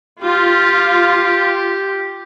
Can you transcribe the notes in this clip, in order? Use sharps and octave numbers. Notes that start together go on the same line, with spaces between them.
F4 G4